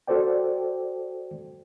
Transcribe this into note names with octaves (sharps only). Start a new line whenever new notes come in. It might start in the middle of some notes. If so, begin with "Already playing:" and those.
F#4 A4 C5 D5 G5